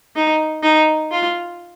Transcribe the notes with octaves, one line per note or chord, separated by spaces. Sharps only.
D#4
D#4
F4